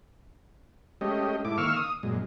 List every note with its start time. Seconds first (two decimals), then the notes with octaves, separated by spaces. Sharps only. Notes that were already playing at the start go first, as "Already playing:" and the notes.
1.01 G#3 A3 C#4 G4 D#5
1.45 G#2 A3 E4 D6
1.58 D#3 A#3 F5 C#6 E6 F6
1.76 D#6
2.03 F#2 A#2 G#3